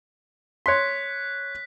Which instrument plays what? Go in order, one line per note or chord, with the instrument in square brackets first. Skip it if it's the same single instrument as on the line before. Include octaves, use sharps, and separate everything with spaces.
[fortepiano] C#5 C6 [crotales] F#6 B6